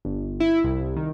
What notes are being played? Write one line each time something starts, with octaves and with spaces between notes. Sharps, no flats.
G1
E4
C2
D#3